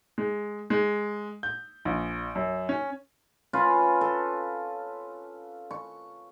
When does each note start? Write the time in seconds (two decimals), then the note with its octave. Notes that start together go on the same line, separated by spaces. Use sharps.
0.18 G#3
0.70 G#3
1.43 G6
1.85 A#1
2.35 F#2
2.69 C#4
3.53 C#4 F4 B4
4.01 A4
5.71 C#6